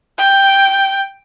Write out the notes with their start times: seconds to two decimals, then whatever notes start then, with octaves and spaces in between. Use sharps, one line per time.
0.18 G5